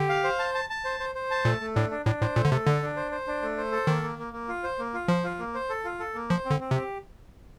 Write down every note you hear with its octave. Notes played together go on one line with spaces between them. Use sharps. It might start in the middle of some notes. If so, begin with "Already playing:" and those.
Already playing: D3 G4
F5
C5
A5
A5
A5
C5
C5
C5
A5
A#2 A3
A3
A2 D4
D4
A2 D4
A2 C5
A#2 A3
D3
C3 A4
D3 D4
D4
C5
C5
D4
A3
C5
A4
D#3 A#3
A#3
A#3
A#3
F4
C5
A#3
F4
F3 C5
F4
A#3
C5
A4
F4
A4
A#3
F3 C5
C4
D3
C4
C3
G4